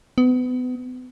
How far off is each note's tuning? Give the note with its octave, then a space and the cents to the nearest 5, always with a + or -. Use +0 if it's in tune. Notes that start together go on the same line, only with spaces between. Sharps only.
B3 +30